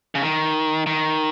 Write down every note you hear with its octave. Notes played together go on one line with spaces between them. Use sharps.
C#3
D#3
D#3